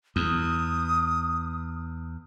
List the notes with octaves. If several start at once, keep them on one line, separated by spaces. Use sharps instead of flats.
E2 D#6